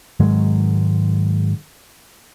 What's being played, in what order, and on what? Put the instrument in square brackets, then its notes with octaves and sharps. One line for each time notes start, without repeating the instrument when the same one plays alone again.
[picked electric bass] G#2 D#3 F#3 G#3